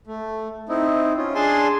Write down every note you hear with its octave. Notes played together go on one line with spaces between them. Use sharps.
A3
C4 D#4 E4
C#4 F4
D4 G#4 G#5 A5 C6